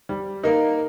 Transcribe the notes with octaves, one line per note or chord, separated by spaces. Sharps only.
G3
A#3 D#4 A#4